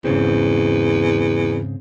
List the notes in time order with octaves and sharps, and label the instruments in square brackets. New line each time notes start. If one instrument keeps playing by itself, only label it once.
[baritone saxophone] E2 [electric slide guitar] G#2 C#3 C4